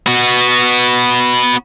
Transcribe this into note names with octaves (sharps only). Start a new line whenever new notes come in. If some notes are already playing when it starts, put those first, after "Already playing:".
B3 F#4